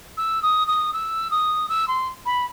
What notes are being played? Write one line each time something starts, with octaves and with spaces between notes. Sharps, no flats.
E6
D#6
D#6
E6
D#6
E6
C6
B5